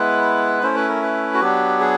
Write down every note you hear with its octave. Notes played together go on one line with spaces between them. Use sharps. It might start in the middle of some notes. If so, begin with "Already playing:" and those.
Already playing: G#3 B3 E4 B4
A3 C#4 E4 C5
B4
A#4
B4
F#4
F#3 B3 D4 G4
G#4